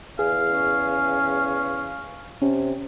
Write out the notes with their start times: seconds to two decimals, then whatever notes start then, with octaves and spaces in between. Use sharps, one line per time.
0.19 E2 G#4 F5
0.49 C#4
2.42 C3 C#4